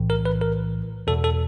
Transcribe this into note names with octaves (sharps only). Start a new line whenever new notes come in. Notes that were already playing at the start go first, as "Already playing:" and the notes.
Already playing: B1 A2 E3
A#4
B4
A#4
E2 B2 A4
A4